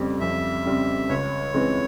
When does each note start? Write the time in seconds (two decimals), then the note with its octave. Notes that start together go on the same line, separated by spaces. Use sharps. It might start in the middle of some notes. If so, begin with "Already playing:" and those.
Already playing: F2 C#3 G3 C4
0.20 F2 E5
0.65 C#3 G3 C4
1.09 C#2 C#5
1.54 C#3 E3 G#3 C4